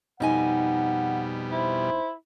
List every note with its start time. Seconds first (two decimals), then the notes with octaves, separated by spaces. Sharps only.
0.20 F2 B2 G3 D#4 F#5 G#5
1.52 E4 C5